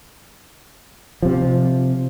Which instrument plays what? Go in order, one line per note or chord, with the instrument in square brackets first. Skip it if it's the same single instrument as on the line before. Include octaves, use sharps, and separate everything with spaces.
[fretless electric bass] C3 F3